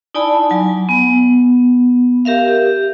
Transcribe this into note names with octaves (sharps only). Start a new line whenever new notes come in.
D#4 E4 D5 G#5 A5 B5
F#3 G#5
B3
G4 A#4 E5 F5
G4